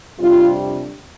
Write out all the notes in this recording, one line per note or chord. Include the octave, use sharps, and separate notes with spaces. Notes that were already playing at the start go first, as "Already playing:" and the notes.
F2 C3 G3 D4 F4